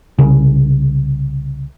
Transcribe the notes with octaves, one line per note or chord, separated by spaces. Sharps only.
C2 C#3